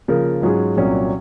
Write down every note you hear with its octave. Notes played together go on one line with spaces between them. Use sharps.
C#3 F3 A#3 F4 A#4
G#2 F#3 C#4 F4 G#4
C2 A#2 F#3 C#4